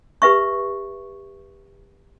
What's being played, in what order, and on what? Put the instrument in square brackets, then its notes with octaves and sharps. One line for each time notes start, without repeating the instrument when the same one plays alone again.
[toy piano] G4 B4 E5 C#6